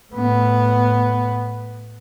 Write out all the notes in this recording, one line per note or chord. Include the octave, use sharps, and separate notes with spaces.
A2 B3